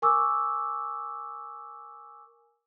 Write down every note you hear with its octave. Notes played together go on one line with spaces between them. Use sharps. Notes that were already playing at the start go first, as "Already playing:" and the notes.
A#4 G#5 C#6 D6 E6